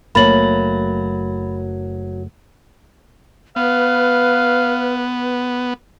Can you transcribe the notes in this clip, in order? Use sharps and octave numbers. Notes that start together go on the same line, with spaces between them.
F#1 F#3 A3 A#3 B5 A6 F#7
B3 B4 F5